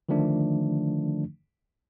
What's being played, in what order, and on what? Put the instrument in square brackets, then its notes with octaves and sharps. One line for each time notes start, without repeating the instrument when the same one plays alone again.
[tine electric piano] D3 D#3 F3 A3 D4